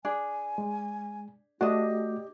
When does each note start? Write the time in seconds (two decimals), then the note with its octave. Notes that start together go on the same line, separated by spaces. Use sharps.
0.05 D4 G#4 G#5
0.58 G#3
1.61 A3 D4 F#4 G4 D#5